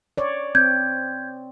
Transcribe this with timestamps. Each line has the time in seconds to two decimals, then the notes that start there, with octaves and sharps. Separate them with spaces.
0.18 C#5 D5
0.55 C4 G6 G#6